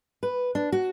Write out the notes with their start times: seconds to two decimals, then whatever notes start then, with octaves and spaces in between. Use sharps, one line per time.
0.23 B4
0.55 D4
0.72 F#4